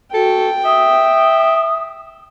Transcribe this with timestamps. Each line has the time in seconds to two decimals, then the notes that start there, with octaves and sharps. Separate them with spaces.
0.14 F#4 A4 G5
0.65 E5 D#6